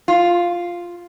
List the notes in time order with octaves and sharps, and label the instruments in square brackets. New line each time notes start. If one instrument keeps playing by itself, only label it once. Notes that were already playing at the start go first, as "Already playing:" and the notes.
[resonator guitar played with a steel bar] F4